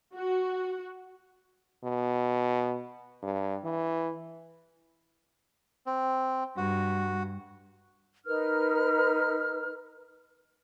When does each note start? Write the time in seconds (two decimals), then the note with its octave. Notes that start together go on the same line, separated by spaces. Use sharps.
0.14 F#4
1.84 B2
3.22 G2
3.64 E3
5.86 C4
6.57 G2 F#4
8.26 D#4 A#4 B4 F6